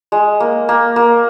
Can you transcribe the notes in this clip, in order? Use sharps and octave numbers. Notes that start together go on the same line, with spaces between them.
G#3
A#3
A#3
A#3